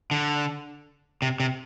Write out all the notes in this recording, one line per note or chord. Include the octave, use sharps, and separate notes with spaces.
D3
C3
C3